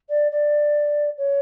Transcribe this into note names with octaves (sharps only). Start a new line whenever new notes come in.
D5
D5
C#5